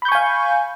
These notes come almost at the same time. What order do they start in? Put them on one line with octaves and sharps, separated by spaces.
B5 G6 C#6 G#5 F5